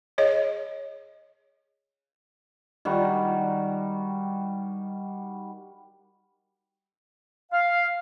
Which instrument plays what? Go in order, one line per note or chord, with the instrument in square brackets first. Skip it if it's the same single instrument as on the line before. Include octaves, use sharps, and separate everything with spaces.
[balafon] G#4 C#5 D#5
[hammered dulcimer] D#3 G3 F#4
[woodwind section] F5